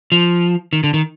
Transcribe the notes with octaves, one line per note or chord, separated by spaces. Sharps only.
F3
D#3
D3
D#3